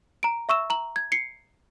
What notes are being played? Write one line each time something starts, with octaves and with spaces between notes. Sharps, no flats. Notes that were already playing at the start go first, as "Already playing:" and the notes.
A#5 D7
E5 C#6 E6 E7
A#5 F#7
G#6
C7 C#7